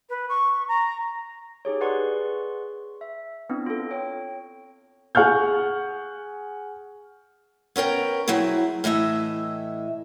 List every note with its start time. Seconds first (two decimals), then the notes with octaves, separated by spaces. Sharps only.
0.09 B4
0.29 C#6
0.68 A#5
1.65 D#4 G4 G#4 C#5
1.81 G#4 B4 D5 F#5 C6 C#6
3.01 E5
3.50 B3 C4 D4 E4
3.66 F4 A4
3.91 C#5 G5
5.15 G#4 F#5 C#6 F6 G6
7.76 B3 C#4 A#4 G5
8.28 F#3 C4 E4 G#4
8.84 A2 E3 D#5 E5